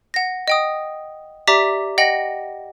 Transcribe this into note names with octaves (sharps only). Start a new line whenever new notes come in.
F#5 A#6
D#5 G5 D#6
G4 D5 E5 A#5 D6 B6
D#5 F#5 G5 A#6 F#7